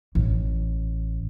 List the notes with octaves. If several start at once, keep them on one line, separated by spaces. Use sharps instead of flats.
A1